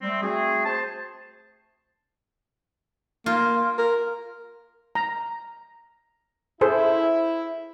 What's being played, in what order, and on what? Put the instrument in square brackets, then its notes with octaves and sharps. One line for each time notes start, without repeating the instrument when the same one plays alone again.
[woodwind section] G3 A3 C4
A3 C4 F#4 G#4
C5 A5
[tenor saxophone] A#3 [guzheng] F4
[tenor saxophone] A#4
[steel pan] A#5
[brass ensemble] E4 [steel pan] G#4 A4 C5